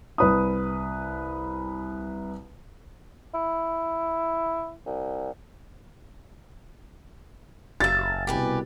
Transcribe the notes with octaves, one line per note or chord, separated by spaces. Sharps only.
C2 B4 D#6
E4
C2
F#1 E5 F5 A6
C2 B2 G4 B4 G#5